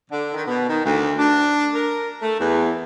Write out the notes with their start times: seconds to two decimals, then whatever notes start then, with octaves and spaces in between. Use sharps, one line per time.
0.11 D3
0.33 D#3
0.46 B2
0.69 D#3
0.84 D2
1.19 D4
1.74 A#4
2.22 A3
2.40 E2